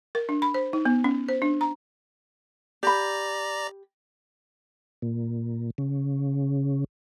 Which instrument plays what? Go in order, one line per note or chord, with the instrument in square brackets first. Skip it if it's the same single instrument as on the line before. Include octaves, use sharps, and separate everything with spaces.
[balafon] A#4
D4
B5
C5
D#4
B3
C#4
C5
D4
A#5
[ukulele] G4 B5 [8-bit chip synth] D5 A#5
[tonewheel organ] A#2
C#3